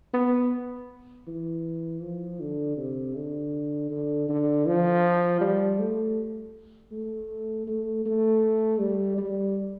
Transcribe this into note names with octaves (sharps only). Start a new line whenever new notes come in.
B3
E3
F3
D3
C3
D3
D3
D3
F3
G3
A3
A3
A3
A3
G3
G3